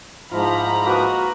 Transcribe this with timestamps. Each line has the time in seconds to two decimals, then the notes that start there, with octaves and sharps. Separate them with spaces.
0.31 G#2 F3 E4 F4 A#5 B5
0.85 A#3 F#4 B4 D#6